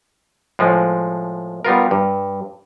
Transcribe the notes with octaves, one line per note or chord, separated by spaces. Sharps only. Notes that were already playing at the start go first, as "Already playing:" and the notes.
A2 F3 G#3
G3 B3 F4 A#4
G2